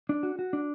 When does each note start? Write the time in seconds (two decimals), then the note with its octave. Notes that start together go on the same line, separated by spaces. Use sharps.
0.09 D4
0.23 F#4
0.39 F#4
0.53 D4